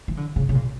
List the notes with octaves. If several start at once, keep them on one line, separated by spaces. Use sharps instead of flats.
E3
D3
C#3
C#3
A#2